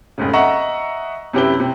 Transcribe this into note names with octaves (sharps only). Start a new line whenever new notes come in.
F1 G#2 C#3
D#5 E5 F#5 A#5 C#6
F#2 C3 E4 G4 B4 G7
C3